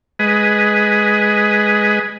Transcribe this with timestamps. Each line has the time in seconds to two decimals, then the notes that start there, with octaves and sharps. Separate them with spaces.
0.19 G#3 G#4 B4 D#5